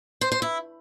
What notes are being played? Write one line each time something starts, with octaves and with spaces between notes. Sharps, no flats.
C5
C5
E4